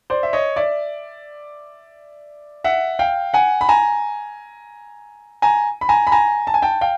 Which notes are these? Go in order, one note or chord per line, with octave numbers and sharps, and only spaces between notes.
C5 D5
E5
C#5 D#5
D5 E5
E5 F#5
F5 G5
F#5 G#5
B5
G#5 A#5
G#5 A#5
B5
G#5 A#5
B5
G#5 A#5
A5
G#5
G5 A5
F5 G5